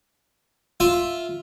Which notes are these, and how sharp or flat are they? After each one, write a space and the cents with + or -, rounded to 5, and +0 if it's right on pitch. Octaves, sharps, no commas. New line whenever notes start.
F4 +0 E5 +0